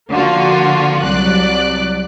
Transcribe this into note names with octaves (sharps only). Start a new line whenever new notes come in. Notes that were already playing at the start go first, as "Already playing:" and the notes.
D3 F3 A#3 F4 F#4
C2 F#3 D5 F#6